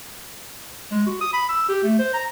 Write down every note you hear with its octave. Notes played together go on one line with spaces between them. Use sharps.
G#3
F#4
D#6
B5
E6
G4
A3
C5
A#5